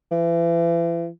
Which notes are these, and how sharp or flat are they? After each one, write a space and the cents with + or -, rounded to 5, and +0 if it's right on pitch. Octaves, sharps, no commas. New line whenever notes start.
E3 +40